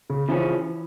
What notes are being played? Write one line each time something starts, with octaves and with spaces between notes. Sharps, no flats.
C#3
C#3 E3 F3 C#4